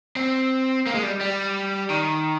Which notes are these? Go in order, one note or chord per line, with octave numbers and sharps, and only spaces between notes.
C4
A#3
G#3
G3
G3
D#3